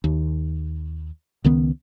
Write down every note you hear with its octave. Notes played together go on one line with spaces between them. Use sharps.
D#2
C#2 D#3 B3